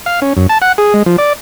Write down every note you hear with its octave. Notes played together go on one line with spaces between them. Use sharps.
F5
C#4
F#2
A5
F#5
G#4
G#3
F3
D5